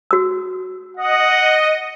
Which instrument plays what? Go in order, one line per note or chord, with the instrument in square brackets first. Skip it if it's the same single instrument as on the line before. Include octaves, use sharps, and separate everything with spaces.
[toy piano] F#4 E6
[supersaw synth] D#5 [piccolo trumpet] F#5